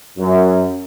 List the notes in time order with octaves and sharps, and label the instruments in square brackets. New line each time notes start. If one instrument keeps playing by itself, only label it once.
[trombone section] F#2